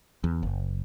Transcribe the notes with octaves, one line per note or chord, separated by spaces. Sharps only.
E2
F#1